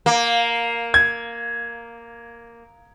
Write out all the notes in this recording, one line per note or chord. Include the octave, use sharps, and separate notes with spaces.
A#3
G#6